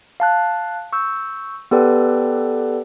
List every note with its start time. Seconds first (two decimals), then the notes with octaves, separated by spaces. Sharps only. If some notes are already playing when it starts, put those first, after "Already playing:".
0.20 F5 A5 F#6
0.93 C#6 E6 G6
1.71 B3 G4 A4 B4 D5 G5